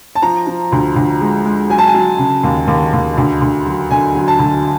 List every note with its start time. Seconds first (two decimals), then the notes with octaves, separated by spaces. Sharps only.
0.15 A5
0.22 F3 A#5
0.47 F3
0.72 D2
0.96 D2
1.21 G#3
1.45 G#3
1.70 F#3 G#5
1.78 A5
1.87 G#5
1.94 F#3
2.18 C#3
2.44 D#2
2.67 D#2
2.93 D#2
3.17 D2
3.42 D2
3.66 F#3
3.91 D3 G#5
4.14 F#3
4.28 A5
4.39 D2